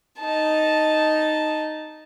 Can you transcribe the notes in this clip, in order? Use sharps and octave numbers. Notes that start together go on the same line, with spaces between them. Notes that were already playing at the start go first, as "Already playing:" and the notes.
D#4 A5